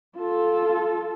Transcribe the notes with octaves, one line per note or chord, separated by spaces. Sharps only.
F4 A4